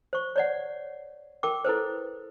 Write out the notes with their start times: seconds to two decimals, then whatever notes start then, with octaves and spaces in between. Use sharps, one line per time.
0.13 C5 C#6
0.36 C#5 D5 F#5
1.43 A#4 G5 D6
1.65 E4 A4 B4 C5